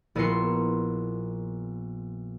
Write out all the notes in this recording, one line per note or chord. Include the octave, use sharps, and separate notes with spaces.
A#1 B3 E4 A#4 C6 C#7